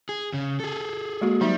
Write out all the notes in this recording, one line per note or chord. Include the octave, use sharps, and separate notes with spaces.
G#4
C#3
G#4 A4
G#3 A#3 F#4
F#3 G3 D#4 E5